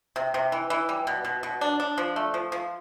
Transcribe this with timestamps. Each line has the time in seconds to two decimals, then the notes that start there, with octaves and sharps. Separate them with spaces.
0.16 C3
0.34 C3
0.52 E3
0.70 E3
0.89 G3
1.07 B2
1.25 B2
1.43 B2
1.61 D4
1.80 D4
1.98 F3
2.16 A3
2.34 F3
2.52 F3